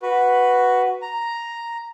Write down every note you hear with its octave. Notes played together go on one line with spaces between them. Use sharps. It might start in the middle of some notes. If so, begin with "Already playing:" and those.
F#4 B4
A#5